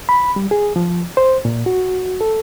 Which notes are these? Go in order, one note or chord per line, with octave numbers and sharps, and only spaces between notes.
B5
G3
G#4
F3
C5
A#2
F#4
A4